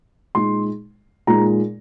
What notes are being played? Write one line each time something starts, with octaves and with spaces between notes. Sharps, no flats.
A#2 G#3 D#4 C6
A#2 G#3 D#4 A#5